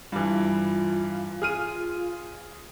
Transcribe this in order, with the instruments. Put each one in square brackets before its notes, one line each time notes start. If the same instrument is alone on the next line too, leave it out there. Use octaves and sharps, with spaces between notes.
[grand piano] G2 E3 [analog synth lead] F4
[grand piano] G#4 F6 D#7